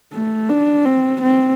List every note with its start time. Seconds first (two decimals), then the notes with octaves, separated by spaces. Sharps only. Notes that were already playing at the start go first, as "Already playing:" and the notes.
0.13 A3
0.49 D4
0.85 C4
1.22 C4